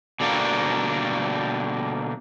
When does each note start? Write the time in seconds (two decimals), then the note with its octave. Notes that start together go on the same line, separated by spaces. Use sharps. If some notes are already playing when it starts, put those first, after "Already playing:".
0.20 B2 D3 G3 A#3 D4